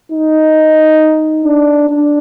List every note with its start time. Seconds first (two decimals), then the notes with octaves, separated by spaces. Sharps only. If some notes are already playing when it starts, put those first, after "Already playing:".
0.12 D#4
1.45 D4
1.90 D4